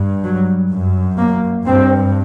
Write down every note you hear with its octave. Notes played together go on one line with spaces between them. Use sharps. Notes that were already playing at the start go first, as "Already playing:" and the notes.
Already playing: G2
F#3
F#2
A#3
G2 C4